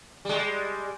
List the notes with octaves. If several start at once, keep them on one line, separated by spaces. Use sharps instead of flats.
G3 G#3